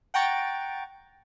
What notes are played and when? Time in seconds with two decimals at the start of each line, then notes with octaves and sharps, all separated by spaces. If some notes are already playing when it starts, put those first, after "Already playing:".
0.14 F#5 G5 A#5 C#6 A6 D7